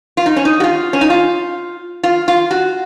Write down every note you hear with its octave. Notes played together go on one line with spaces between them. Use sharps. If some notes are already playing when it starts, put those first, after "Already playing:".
F4
D#4
C#4
D#4
F#4
F4
C#4
D#4
F4
F4
F4
F#4